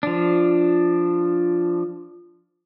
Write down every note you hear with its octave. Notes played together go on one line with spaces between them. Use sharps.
F3 D4